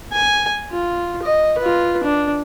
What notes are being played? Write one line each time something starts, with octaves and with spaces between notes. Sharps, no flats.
G#5
F4
D#5
F4 B4
D4